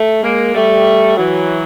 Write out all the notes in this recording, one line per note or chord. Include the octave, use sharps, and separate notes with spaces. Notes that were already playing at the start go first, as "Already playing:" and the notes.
Already playing: A3
G#3 A#3
G3 A3
E3 F#3